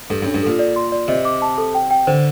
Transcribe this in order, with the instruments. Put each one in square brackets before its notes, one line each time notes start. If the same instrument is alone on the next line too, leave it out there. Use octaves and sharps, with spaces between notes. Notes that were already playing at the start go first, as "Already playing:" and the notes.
[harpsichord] G2 [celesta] A4
[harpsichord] F#2 [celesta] D4
[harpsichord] G2
[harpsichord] A#2 [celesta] A4
[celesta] D5
C6
D5
[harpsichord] C3 [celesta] D#5
[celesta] D6
A5
A4
G5
G5
[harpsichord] D3 [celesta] C5